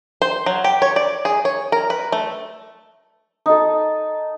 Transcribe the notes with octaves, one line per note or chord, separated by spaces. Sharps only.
C5
F#3
G4
C#5
D5
G#4
C#5
A#4
B4
A3
D#4 A4